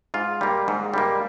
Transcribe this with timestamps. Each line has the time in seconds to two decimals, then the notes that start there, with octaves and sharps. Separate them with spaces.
0.14 G#2 F4
0.41 G3 A#3
0.68 G#2
0.94 G3 A#3